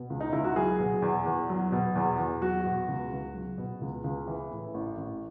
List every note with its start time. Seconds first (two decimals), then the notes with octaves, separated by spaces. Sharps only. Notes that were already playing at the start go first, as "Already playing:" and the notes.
Already playing: B2
0.10 C#2
0.20 D#4
0.33 C#2 E4
0.44 F#4
0.56 F#3 G#4
0.79 B2
1.02 E2
1.26 E2
1.50 F#3
1.72 B2
1.95 E2
2.19 E2
2.42 F#3 F#4
2.65 B2
2.89 C#2
3.12 C#2
3.35 F#3
3.58 B2
3.81 C#2
4.04 C#2
4.27 E3
4.51 A2
4.74 A1
4.97 A1